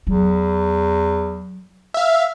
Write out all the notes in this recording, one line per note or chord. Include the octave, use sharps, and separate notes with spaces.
E2 F#3
E5 F5